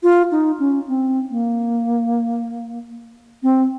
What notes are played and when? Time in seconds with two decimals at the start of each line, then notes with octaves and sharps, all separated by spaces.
0.03 F4
0.32 D#4
0.60 C#4
0.88 C4
1.31 A#3
3.43 C4